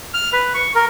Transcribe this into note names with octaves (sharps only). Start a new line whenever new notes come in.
F6
B4
C#6
A#4